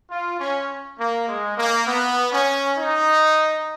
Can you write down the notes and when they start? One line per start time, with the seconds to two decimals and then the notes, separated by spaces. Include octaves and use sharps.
0.10 F4
0.40 C#4
0.99 A#3
1.28 G#3
1.57 A#3
1.87 B3
2.32 C#4
2.77 D#4